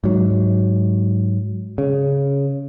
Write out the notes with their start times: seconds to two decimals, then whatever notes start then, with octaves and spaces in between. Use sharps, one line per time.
0.04 G#2 F#3
1.78 C#3